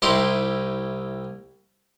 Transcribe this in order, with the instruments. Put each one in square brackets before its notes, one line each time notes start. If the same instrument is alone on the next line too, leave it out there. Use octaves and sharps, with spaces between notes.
[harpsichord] C2 D#4 E4 G4 D#5 C6